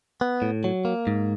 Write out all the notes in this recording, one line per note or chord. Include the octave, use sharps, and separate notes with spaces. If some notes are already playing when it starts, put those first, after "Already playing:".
B3
A2
F#3
A#3
G#2